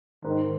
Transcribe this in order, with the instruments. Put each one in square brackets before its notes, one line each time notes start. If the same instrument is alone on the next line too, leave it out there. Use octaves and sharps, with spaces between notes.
[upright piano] G#2 [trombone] D#3